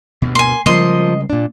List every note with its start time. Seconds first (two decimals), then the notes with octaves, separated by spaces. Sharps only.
0.22 D2 G2 B2
0.35 A#3 G#5 C6
0.66 C#3 F3 G3 G#3 A#3 D#5 C6
1.30 A#2 D4